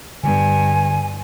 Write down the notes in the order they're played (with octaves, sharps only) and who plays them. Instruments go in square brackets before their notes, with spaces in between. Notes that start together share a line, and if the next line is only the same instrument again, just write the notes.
[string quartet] G2 [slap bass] D3 B3 [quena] G#5